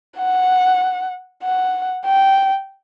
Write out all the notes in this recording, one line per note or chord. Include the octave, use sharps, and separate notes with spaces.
F#5
F#5
G5